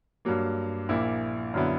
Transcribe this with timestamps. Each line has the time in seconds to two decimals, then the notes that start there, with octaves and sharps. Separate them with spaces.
0.25 G2 F#3 A#3
0.89 A#1 A#2 A#3 E4
1.54 F#2 D3 F#3 B3 E4